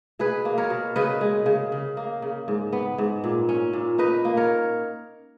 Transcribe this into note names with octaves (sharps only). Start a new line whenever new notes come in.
B2 G#4 B4
A#3
A#4 C#5
B2
C#3 B4 D#5
G#3
C#3
C#3
A#3
C#3
G#2
B3
G#2
A#2
C#4
A#2
D#4 B4 D#5
A#3
A#4 C#5